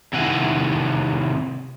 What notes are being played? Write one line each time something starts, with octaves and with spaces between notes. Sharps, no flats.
C3 D#3 E4 F#5 G#5